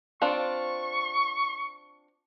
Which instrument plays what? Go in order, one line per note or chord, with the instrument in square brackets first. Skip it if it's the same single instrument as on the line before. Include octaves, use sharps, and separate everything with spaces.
[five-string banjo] C4 D4 F4 [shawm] C#6